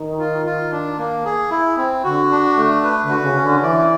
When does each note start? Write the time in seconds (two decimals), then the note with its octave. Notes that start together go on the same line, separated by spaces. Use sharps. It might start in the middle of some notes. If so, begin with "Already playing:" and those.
Already playing: D#3
0.19 F4
0.46 F4
0.72 D4
0.98 A#3
1.25 G#4
1.51 E4
1.77 C4
2.04 D3 F#4
2.31 D4
2.57 A3
2.83 B4
3.03 D3
3.09 F#4
3.23 C#3
3.35 C#4
3.42 D3
3.63 E3 D5